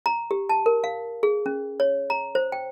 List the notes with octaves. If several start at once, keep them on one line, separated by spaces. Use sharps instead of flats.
A#5
G4
A5
A#4
F5
G#4
C#4
C#5
A#5
C5
G5